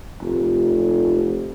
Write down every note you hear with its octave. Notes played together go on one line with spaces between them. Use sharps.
F1